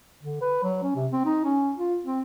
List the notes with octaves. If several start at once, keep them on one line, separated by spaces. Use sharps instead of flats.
D3
B4
F#3
C#4
C3
C4
D#4
C#4
F4
C4